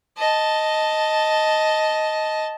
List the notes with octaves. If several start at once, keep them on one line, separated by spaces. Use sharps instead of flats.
D#5 A5